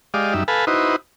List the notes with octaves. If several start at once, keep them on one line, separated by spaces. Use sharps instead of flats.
G#3 G4 D5 D#5 F5
F#2 G3 D#4 E5
A4 B4 F5 G#5 A5 B5
D#4 E4 F#4 B4 C5 D#5